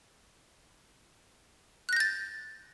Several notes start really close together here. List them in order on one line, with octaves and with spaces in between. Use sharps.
F#6 A#6 G6 A6